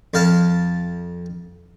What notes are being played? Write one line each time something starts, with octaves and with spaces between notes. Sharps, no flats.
F2 F5 A5